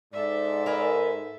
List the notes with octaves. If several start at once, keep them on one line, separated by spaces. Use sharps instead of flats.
G#2 A4 D5 E5
A#4 B4 G#5